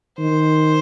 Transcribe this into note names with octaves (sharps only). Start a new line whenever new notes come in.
D#3 C5